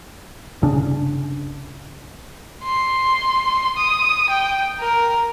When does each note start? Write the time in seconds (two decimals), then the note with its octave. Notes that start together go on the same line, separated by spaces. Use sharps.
0.62 G1 C2 C#3 D4
2.64 C6
3.77 D#6
4.29 G5
4.80 A#4